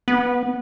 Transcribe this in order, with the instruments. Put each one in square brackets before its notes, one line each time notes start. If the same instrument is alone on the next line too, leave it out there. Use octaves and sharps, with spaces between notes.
[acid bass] B3